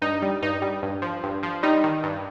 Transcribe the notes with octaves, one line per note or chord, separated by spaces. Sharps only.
G2 D#4
G3
G2 D#4
G3
G2
F3
G2
F3
G3 D#4
D#3
G2